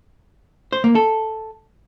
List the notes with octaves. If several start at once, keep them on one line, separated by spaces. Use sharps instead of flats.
C5
A#3
A4